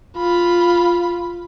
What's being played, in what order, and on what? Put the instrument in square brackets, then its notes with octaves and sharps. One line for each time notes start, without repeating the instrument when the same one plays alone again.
[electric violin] F4 B5